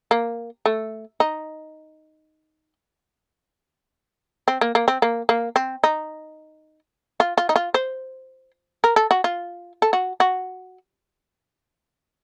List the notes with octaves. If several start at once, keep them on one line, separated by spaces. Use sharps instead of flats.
A#3
A3
D#4
C4
A#3
A#3
C4
A#3
A#3
C4
D#4
F4
F4
D#4
F4
C5
A#4
A4
F#4
F4
A4
F#4
F#4